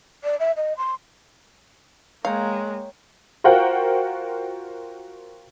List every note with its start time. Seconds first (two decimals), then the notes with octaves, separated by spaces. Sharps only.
0.24 D5
0.40 E5
0.56 D#5
0.77 C6
2.25 G#3 A#3 C#5 F5 G5 A#5
3.44 F4 F#4 A#4 C5 F#5 G5